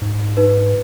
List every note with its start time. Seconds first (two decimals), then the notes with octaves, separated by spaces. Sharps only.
0.02 G#2
0.37 D#4 B4